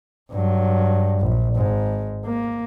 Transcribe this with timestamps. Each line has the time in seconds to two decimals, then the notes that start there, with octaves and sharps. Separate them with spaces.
0.31 G2 F#3
1.20 A#1
1.55 G#1 G#2
2.26 A#3